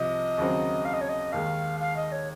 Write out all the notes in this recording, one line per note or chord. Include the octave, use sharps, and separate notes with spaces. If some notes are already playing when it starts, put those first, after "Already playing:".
Already playing: C2 C3 F3 D#5
D#2 C#3 F#3 C4
F5
D#5
C#5
D#5
D#2 D#3 G#3 F5
F5
D#5
C#5